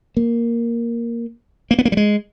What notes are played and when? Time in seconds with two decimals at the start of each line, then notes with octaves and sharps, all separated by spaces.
0.17 A#3
1.71 A#3
1.79 B3
1.85 A#3
1.92 G3
1.97 G#3